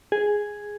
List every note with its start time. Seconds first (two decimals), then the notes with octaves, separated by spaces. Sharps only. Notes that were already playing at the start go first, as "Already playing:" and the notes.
0.12 G#4